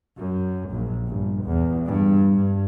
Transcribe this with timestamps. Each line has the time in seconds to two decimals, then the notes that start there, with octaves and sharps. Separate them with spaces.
0.18 F#2
0.70 A#1
1.07 G1
1.45 E2
1.88 G2
2.32 G2